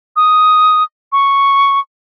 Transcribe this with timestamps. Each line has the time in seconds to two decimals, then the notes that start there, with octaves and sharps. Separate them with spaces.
0.16 D#6
1.12 C#6